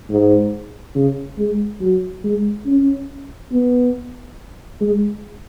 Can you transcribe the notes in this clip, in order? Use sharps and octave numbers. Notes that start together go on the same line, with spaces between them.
G#2
C#3
G#3
F#3
G#3
C#4
B3
G#3